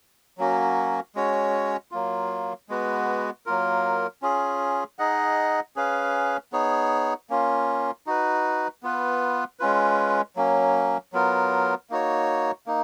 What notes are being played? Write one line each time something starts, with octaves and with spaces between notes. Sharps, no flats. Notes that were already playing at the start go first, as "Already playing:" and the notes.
F#3 A#3 C#4 F#4
G#3 C#4 F#4 C#5
F#3 A#3 F4
G#3 B3 F#4 B4
F#3 A#3 F4 A#4
C#4 F4 G#4
D#4 G#4 D#5 F#5
C#4 G#4 B4 F5
B3 D#4 G#4 C#5
A#3 C#4 F4
D#4 F#4 B4
B3 F4 B4
G#3 C#4 F4 B4
F#3 A#3 C#4
F#3 B3 F4 A#4
A#3 D#4 F#4 C#5
A#3 D#4